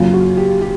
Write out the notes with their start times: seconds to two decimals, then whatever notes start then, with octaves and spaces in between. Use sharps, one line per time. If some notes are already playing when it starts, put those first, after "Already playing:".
Already playing: F#2 C#3 F#3 A#3 F4
0.13 F#4
0.37 G4
0.61 G4